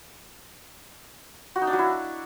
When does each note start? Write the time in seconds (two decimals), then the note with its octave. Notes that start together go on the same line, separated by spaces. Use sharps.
1.56 F#4
1.61 D#4
1.67 D4
1.73 F#3
1.79 E4